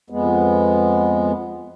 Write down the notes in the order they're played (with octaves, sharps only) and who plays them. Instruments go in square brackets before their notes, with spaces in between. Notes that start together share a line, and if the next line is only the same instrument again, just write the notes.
[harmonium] F2 G#3 B3